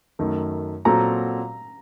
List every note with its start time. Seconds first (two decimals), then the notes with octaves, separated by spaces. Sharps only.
0.19 F#2 D#3 A3
0.85 A#2 F#3 C4 F#4 A4 A#5